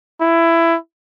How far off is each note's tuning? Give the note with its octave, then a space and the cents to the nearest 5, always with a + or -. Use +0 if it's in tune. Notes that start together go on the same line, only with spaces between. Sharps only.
E4 +15